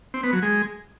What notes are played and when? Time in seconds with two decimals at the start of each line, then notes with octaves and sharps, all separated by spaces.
0.14 C4
0.23 B3
0.33 F#3
0.42 G#3